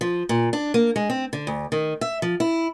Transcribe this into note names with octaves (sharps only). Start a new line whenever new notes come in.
F3
A#2
D4
A#3
G#3
C4
D3
D2
D#3
E5
F3
E4